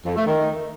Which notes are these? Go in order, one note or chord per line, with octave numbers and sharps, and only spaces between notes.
F2
A3
D#3